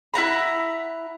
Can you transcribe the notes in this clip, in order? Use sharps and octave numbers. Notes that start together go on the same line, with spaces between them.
E4 F#5 A#5 B5